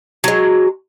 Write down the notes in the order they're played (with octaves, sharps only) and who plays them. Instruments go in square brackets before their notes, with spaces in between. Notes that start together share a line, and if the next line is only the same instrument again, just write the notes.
[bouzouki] F#3 G#3